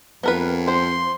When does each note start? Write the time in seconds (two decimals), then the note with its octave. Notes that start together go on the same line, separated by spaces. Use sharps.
0.23 F2 B3 A#4 B4
0.68 C5 C6